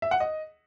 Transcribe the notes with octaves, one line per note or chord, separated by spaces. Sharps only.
E5
F#5
D#5